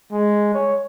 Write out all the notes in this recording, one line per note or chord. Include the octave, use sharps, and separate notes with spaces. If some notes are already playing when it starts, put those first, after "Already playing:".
G#3
C#5